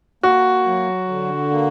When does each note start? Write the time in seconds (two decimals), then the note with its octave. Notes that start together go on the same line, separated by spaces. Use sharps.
0.23 A#3 F#4
0.66 F#3
1.08 D3
1.51 A#3